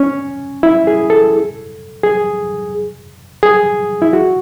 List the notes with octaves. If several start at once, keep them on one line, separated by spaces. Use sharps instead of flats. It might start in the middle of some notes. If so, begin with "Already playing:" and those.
Already playing: C#4
E4
G#4
A4
G#4
G#4
E4
F#4